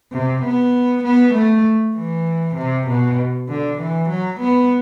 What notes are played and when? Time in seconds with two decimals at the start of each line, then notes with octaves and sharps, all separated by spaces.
0.12 C3
0.43 B3
1.04 B3
1.34 A3
1.96 E3
2.56 C3
2.87 B2
3.49 D3
3.79 E3
4.10 F#3
4.41 B3